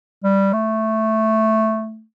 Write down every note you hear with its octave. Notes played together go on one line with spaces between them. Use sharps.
G3
A3